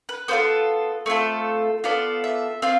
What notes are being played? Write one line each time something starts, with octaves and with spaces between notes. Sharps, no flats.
B4
B3 F4 A4 C5
A3 C4 F4 A4
B3 F4 A4 D5
E5
C4 F4 F5